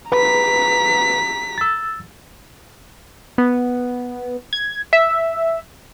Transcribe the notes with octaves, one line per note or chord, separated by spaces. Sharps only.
B4 A#5 B6
E6 A6
B3
G#6
E5